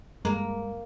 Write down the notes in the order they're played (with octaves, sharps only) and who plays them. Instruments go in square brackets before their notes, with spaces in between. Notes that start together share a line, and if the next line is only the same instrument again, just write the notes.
[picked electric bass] G2 [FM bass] G#3 [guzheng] A#3